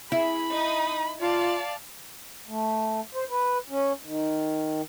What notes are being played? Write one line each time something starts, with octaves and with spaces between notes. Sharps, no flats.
E4 G#4 B5
D#4 D#6
F4 D5 F5 A5
A3
C5
B4
C#4
D#3